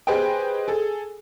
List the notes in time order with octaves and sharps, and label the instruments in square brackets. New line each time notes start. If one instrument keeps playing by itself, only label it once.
[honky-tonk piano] G4 G#4 B4 C5 D#5 G5
G#4 A4